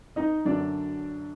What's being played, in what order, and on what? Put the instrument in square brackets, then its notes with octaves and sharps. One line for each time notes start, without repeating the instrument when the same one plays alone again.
[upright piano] D#4 D#5
F#2 D3 F#3 D4 D5